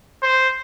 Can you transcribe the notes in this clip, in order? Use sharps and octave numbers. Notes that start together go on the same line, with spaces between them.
C5